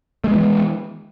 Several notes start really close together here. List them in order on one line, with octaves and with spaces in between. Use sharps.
A3 G#3 B3 E3